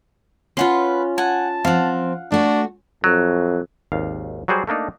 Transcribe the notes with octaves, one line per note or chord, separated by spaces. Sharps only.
C#4 F4 B4 F#5 C6
F#5 G#5 A5
F3 C4 F5 F#5
A3 D4 F#4
F2 F#3
G#1 D#2 F5
F#3 G3 F#4 G#4 C5 D5
A3 A#3 D4 D#4